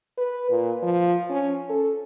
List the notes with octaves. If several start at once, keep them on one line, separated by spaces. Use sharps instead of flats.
B4
A#2
F3
C#4
A4